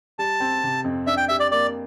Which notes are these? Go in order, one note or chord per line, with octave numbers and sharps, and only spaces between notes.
G3 A5
C4
C3
F2
D4 E5
G5
G4 E5
D5
A#3 D5